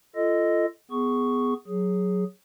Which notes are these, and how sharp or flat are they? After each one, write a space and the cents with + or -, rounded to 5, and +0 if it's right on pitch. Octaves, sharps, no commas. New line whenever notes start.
F4 -25 A4 +0 D#5 +0
B3 +15 G#4 +0 C#6 +0
F#3 +0 G#4 +0